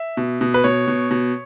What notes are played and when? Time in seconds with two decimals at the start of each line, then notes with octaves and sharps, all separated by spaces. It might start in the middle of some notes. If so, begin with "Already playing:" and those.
Already playing: E5
0.17 B2
0.41 B2
0.54 B4
0.64 B2 C#5
0.87 B2
1.11 B2